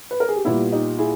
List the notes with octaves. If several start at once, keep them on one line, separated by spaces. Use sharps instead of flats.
B4
A#4
G#4
G4
A#2 G3 B3 E4
D#4 G4
E4 G#4